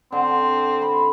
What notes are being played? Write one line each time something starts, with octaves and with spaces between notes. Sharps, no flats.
D3 C4
B5